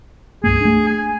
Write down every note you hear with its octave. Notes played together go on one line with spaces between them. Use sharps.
C2 G2 A#3 G#4
A3 D4
G#5